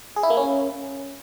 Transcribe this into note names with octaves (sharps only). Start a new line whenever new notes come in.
G#4
E4
A#3
C#4